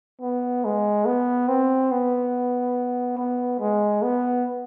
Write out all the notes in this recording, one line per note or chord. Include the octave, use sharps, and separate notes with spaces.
B3
G#3
B3
C4
B3
B3
G#3
B3